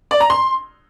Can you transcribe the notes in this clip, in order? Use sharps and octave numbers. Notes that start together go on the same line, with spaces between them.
D5
A#5
C6